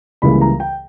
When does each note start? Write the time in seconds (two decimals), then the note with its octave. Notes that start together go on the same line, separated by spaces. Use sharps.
0.22 C#2 C#3 E3 G3 A#3 B5
0.41 A#5
0.60 G5